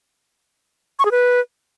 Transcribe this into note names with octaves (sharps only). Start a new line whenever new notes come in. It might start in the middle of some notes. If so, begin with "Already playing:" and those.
C#6
G#4
B4